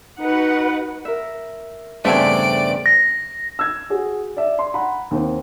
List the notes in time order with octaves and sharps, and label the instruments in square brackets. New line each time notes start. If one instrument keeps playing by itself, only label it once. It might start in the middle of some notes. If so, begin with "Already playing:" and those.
[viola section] D#4 F#4 B4 F#5
[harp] A#4 E5
[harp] E2 G2 C#3 [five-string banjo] A3 C4 G#5 [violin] D5 D7
[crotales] A#6
[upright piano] E6 G#6
F#4 G#4
D5 E5
C6
F#5 A#5 B5
D#2 C4